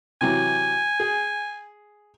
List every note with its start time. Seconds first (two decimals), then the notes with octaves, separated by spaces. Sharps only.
0.21 C3 E3 F#3 G#5
1.00 G#4